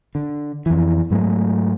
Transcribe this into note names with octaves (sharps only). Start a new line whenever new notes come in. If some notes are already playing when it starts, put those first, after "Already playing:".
D3
F2 E3
G#2 F#3 G3 A3